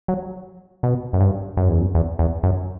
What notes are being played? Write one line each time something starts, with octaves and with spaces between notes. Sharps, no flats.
F#3
B2
F#2
G2
F#2
E2
F#2
E2
E2
F#2